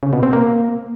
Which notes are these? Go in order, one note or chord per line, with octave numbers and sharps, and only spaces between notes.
C#3
B2
C4
A#3